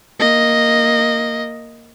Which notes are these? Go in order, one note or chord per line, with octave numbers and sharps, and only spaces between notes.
A#3 D#5